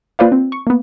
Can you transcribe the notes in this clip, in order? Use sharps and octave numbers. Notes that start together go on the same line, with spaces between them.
A#3 F4 B4 C5 D5 F5
C4
C#6
A#3 B3